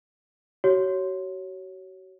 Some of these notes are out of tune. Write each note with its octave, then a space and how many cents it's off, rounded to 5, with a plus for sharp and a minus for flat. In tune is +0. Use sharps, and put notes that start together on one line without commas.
F#4 +35 C#5 +0